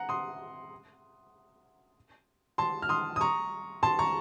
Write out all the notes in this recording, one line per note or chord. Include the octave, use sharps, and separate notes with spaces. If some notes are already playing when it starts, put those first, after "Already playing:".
Already playing: F#5 A#5
C6 D#6
A5 C6
F6
C6 D#6
D#6
A#5 C#6
A5 C6
A#5 C#6